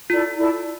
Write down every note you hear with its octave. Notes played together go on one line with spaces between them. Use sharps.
E4 F4 A4 D5
E4 A4 D5